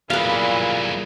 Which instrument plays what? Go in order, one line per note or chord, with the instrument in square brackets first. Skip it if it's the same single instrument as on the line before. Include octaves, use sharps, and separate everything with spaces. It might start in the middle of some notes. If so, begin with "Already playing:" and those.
[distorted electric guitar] B1 G2 [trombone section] A#2 [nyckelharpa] E4 G#4 [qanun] B4 F5